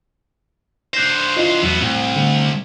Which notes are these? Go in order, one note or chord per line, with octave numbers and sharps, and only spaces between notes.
D4 C5 G6 A#6
E4 F4 D#5
E2 A2 F#3 B3
C2 A2 C4
D3 A3